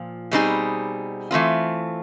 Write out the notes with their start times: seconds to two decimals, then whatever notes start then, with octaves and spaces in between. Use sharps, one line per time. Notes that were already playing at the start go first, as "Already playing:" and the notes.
Already playing: A#2 F3
0.31 B2 G3 C4 D#4 G#4
1.31 E3 A3 C4 F4